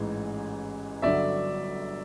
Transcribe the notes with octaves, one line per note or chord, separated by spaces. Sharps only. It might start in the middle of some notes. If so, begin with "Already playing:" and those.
Already playing: A1 G#2 E3 G#3
G1 G2 D3 F#3 D5 E5